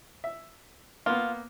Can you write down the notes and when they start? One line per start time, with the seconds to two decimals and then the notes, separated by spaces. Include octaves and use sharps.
0.24 E5
1.06 A#3 B3 F4